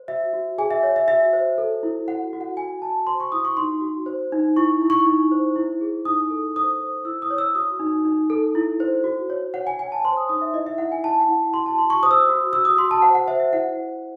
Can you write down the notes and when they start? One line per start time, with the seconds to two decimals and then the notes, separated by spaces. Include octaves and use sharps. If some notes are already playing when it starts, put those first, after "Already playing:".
Already playing: C5
0.08 F#4 E5
0.33 F#4
0.58 G#4 G#5
0.71 E5
0.83 C#5
0.96 E5
1.08 F#4 E5
1.33 C5
1.58 A4
1.83 E4
2.07 F#4 F#5
2.33 F#4
2.41 F#5
2.57 F#4 G#5
2.82 F#4 A5
3.07 C5 C6
3.20 C#6
3.32 E4 D#6
3.45 C#6
3.57 D#4 C6
3.81 F#4
4.06 C5
4.32 D#4
4.56 E4 C#6
4.82 E4
4.90 C#6
5.06 D#4
5.32 C5
5.56 E4
5.81 G#4
6.05 D#4 D#6
6.30 A4
6.56 C5 D#6
6.80 C5
7.05 E4 E6
7.22 D#6
7.31 C#5
7.38 E6
7.55 F#4 D#6
7.80 D#4
8.05 D#4
8.30 A4
8.55 E4
8.80 C5
9.04 F#4
9.30 C#5
9.54 C#5 F#5
9.67 G#5
9.79 C#5 G#5
9.92 A5
10.05 C5 C6
10.17 D#6
10.29 D#4 D#6
10.42 E5
10.54 E4 D#5
10.66 E5
10.78 E4 F#5
10.92 G#5
11.04 E4 A5
11.20 F#5
11.29 E4
11.53 F#4 C6
11.66 A5
11.78 F#4 C6
11.90 C#6
12.03 C5 D#6
12.11 E6
12.18 D#6
12.29 F#4
12.53 F#4 E6
12.65 D#6
12.78 F#4 C6
12.91 A5
13.02 C5 F#5
13.15 F#5
13.28 C5 E5
13.40 E5
13.53 E4 F#5
13.77 C5